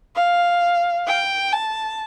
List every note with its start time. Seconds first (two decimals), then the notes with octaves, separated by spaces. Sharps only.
0.16 F5
1.07 G5
1.53 A5